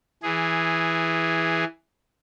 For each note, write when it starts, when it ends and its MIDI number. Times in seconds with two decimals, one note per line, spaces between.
0.23 1.64 52
0.23 1.64 68